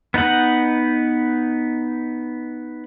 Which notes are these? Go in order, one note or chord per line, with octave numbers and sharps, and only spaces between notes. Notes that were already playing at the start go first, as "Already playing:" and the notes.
B3 D#4 B4 F#5